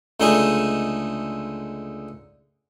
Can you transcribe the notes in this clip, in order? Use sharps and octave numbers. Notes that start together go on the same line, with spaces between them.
C#2 D3 A3 D#4 G#4 G#5